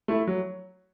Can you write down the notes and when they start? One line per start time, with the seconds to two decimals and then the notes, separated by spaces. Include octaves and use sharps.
0.08 A3 E4
0.27 F#3